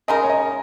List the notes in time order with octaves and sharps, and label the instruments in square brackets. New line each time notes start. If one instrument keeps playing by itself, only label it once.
[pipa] C#3 G#3 D#4 A#4 [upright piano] D#5
[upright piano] C#5
D#5